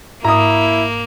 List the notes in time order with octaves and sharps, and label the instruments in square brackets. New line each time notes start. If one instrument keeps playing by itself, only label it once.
[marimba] G#2 [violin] A#3 [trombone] E4 [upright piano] A#5 D#6